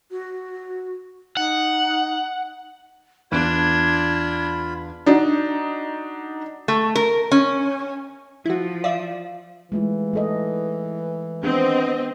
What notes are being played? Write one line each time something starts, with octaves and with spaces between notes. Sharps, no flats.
F#4
D#4 F#5
E2 D4 F4 B5 F#6 G#6 D7
D4 D#4 F#4
A3
A#4
C#4
F3 E4 F#4
D5 E5 F5
E3 G#3 A3 F4
A3 A4 D#5
D#3 B3 C4 D4 D#5